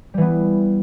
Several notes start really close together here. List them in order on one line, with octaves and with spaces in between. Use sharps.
G3 E3 B3